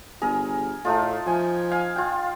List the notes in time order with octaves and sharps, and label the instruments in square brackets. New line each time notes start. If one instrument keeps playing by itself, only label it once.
[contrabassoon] G1 [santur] G#4 A#4
[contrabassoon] A2 [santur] A3 D#4 F4
[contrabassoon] F3 [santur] G#5
[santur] F5 G#5
F4 G5